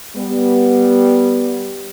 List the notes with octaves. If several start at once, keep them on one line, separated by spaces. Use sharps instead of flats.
G3 B3